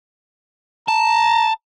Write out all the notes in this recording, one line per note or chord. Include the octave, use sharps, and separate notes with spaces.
A5 A#5